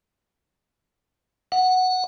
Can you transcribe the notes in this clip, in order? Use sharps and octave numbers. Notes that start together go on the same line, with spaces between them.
F#5